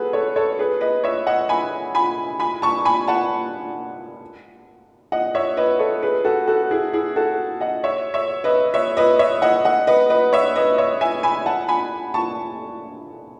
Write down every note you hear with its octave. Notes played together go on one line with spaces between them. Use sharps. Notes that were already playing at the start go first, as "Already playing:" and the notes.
Already playing: F#4 G#4 A4 B4
A4 C#5
A4 C#5
G#4 B4
B4 D#5
C#5 E5
D#5 F#5
G#5 B5
G#5 B5
G#5 B5
A5 C#6
G#5 B5
F#5 A5
D#5 F#5
C#5 E5
B4 D#5
A4 C#5
G#4 B4
F#4 A4
F#4 A4
E4 G#4
E4 G#4
F#4 A4
D#5 F#5
C#5 E5
C#5 E5
B4 D#5
C#5 E5
B4 D#5
C#5 E5
D#5 F#5
D#5 F#5
B4 D#5
B4 D#5
C#5 E5
B4 D#5
C#5 E5
E5 G#5
G#5 B5
F#5 A5
G#5 B5
A5 C#6